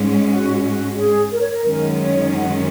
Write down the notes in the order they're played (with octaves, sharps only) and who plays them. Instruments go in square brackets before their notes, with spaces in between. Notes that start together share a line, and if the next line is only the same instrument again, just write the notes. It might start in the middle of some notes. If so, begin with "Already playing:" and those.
Already playing: [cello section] G#2 G#3 C#4
[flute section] F#4
F#4
G#4
A#4
C#5
A#4
[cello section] F#2 D#3 G#3 C#4 [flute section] A#4
[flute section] C#5
F#5